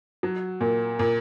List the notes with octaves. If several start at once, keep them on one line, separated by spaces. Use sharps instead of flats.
F#3
A#2
A#2